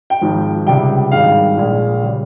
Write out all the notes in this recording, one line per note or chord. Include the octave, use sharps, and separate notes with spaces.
G5
G#1 G#2 F3
C#2 C3 G3 G5
G#1 G2 D#3 G#3 F5
A#1 A#2 G#3
C#3 G3